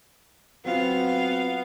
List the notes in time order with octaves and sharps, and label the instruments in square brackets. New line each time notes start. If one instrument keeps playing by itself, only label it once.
[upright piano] F#3 C4 F4 [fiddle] B3 F5